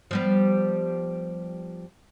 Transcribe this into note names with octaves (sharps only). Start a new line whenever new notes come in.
F3 G3 B3